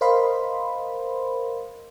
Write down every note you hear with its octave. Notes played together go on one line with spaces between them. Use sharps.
A#4 C5 D#5 F5 B5 C6